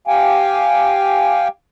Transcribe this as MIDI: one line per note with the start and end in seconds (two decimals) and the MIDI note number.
0.08 1.48 67
0.08 1.48 77
0.08 1.48 79
0.08 1.48 80